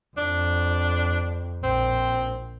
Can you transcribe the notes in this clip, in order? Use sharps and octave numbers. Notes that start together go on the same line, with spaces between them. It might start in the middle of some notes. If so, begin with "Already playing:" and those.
F2 D4
A#1 C4